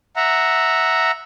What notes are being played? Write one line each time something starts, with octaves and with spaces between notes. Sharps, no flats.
E5 F#5 A#5